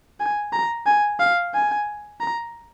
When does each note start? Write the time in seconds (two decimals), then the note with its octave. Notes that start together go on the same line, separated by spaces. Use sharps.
0.20 G#5
0.53 A#5
0.87 G#5
1.20 F5
1.54 G#5
2.21 A#5